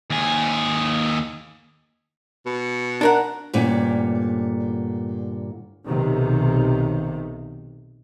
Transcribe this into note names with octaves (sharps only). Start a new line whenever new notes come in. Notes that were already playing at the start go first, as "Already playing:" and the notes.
D#2 G#4
B2
D4 A#4 F#5
D2 G2 A#2 C#4
B1 C3 D#3